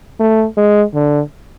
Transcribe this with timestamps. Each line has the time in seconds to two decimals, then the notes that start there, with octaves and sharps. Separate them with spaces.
0.20 A3
0.57 G#3
0.94 D3